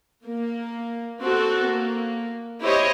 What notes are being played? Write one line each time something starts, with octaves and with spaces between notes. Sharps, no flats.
A#3
C4 F#4 A4
A#3
E4 G4 C5 C#5 D#5